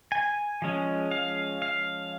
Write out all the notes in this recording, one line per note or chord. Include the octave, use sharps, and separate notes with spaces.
G#5
F3 G#3 C#4
F5
F5